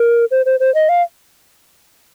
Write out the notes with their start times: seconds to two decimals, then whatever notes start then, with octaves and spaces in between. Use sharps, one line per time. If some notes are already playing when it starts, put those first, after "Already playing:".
Already playing: A#4
0.31 C5
0.46 C5
0.60 C5
0.75 D#5
0.89 F5